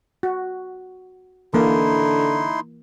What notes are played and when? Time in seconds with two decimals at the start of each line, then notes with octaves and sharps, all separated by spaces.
0.23 F#4
1.54 D3 E3 A#3 D#4 E4 C6